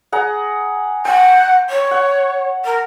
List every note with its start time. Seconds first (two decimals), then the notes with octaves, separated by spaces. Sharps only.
0.12 G#4 F#5 A#5
1.05 F#5 G5
1.69 C#5
1.91 F#5
2.64 A#4